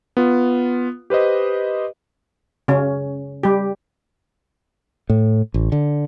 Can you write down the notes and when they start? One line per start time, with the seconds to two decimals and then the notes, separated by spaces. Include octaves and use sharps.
0.17 B3 F4
1.10 G4 B4 C5 D#5
2.68 C#3 C#4
3.43 G3 G4
5.10 A2
5.54 A1
5.72 D3